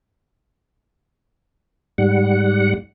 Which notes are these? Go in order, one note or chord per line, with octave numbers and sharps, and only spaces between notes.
G#2 G3 F#5